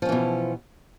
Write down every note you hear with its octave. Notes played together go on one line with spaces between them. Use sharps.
B2 E3 F3 C#4